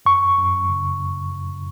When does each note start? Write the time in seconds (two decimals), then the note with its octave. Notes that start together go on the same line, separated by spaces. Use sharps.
0.06 F#2 C#6
0.38 F#2
0.70 C#3
1.01 F#2
1.32 F#2